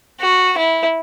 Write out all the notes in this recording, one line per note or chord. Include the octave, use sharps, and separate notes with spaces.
F#4
E4